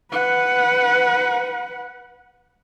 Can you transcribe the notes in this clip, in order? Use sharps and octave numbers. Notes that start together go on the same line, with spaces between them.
B4 F#5